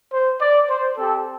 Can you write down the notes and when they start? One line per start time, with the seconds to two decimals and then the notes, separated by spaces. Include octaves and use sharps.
0.12 C5
0.40 D5
0.68 C5
0.96 C4 G4 A4